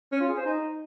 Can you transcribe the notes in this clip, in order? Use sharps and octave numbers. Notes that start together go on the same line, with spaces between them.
C#4
F4
G#4
C5
D#4